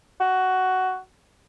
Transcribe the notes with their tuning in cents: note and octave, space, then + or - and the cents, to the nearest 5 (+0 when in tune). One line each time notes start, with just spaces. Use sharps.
F#4 +10